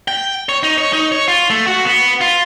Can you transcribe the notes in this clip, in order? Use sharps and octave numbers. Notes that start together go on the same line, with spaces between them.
G5
C#5
D#4
C#5
D#4
C#5
F4
A3
F#4
B3
F4